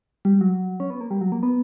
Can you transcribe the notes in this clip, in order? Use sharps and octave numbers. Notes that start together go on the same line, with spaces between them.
G3
F#3
C#4
B3
A#3
G3
F#3
A#3
B3